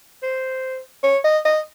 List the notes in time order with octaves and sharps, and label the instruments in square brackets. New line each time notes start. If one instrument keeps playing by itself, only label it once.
[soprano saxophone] C5
C#5
D#5
D#5